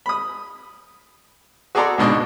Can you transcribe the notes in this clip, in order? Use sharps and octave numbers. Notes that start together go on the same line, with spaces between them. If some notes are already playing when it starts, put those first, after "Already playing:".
B5 D#6
F#4 G#4 A4 D5 A#5 C6
C#2 G#2 B2 D4 D#5 C#6